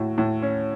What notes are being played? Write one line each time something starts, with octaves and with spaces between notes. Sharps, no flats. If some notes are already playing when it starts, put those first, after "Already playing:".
Already playing: A2 F#4
A2
C#4